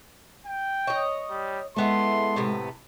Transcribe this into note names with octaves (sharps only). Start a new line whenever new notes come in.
G5
C#5 D#5
G3
G#3 A3 B3 E4 C6
A2 C3 B3